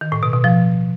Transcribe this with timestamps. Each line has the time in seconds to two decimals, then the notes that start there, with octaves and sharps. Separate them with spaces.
0.01 D#3
0.12 A2
0.23 B2
0.33 B2
0.44 F3